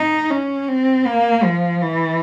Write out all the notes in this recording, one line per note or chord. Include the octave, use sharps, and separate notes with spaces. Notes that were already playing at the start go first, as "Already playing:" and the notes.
Already playing: D#4
C#4
C4
A#3
F3
E3